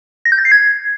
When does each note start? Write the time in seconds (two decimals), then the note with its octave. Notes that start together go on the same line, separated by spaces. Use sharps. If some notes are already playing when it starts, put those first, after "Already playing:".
0.25 A#6
0.32 G6
0.39 A6
0.45 C7
0.52 G#6